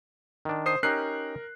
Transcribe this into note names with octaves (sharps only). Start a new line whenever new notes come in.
D#3 D4
C5 D#6 C7
C#4 D#4 G4 A#4 F#6 C7